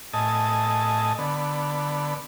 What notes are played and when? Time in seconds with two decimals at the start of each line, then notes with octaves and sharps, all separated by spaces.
0.13 A2 D#5 G#5 A5
1.19 D3 B3